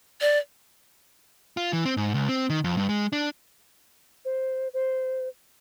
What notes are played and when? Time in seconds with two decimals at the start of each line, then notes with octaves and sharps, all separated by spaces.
0.21 D5
1.57 F4
1.73 E3
1.85 C4
1.97 G#2
2.14 C#2
2.29 C4
2.50 D#3
2.64 F2
2.77 G2
2.89 G#3
3.13 D4
4.25 C5
4.74 C5